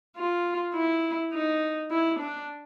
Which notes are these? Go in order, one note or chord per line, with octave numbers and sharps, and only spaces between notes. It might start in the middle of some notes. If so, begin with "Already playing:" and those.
F4
E4
D#4
E4
D4